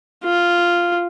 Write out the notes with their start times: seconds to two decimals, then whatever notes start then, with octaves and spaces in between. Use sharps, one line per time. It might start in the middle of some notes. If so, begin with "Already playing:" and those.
0.24 F4